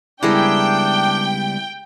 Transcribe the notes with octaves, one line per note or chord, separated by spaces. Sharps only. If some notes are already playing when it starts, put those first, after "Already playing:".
C#2 G3 B3 D4 E4 G#4 A#4 G5